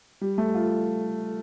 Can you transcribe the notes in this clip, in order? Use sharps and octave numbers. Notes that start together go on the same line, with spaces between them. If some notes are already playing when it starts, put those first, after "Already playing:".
G3
A3
F4